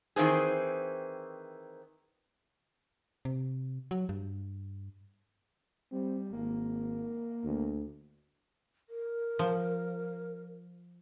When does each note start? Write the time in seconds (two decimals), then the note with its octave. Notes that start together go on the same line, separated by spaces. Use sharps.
0.16 D#3 E3 C4 G#4
3.25 C3
3.91 F#3
4.09 G2
5.92 G3 C4
6.33 G#1 A#3
7.44 D2
8.90 A#4
9.39 F3